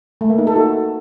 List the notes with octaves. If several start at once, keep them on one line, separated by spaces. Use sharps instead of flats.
A3
A#3
D#4
A4
F#4